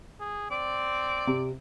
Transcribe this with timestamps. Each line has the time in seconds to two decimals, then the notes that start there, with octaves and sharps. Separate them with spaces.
0.20 G#4
0.51 C4 D5
1.27 C3